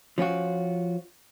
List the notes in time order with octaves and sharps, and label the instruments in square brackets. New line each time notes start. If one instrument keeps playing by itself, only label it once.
[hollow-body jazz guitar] F3 C#4 F4 F#4